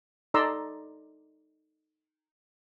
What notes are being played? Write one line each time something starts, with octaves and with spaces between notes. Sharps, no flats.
D#4 A4 D5 A#5 C6 E6